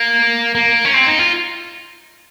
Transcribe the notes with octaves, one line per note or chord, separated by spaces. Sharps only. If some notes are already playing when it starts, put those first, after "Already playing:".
Already playing: A#3
A#3
C#4
C4
D#4
F4